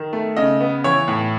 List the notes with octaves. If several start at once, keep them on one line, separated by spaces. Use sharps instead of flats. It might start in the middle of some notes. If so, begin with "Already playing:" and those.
Already playing: D#3
A3
C#3 D#5
B3
E3 C#5
A2